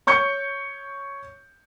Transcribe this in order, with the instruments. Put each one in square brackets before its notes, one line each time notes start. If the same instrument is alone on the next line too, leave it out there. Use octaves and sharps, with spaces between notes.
[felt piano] C#5 C#6 G6 C#7